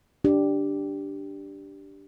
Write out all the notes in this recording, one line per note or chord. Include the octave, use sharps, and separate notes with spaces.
D4 G4